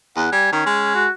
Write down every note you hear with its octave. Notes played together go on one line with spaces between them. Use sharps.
E2 F#5
G3 G#5
D#3 C#4
G#3
F#4